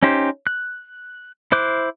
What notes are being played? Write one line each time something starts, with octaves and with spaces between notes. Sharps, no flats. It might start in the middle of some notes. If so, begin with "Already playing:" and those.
C#4 D#4 G4 C5
F#6
E4 C5 D6 F#6